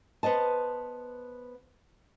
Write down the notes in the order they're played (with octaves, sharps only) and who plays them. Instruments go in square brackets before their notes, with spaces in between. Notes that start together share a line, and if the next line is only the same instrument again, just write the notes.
[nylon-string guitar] B3 C5 D#5 A5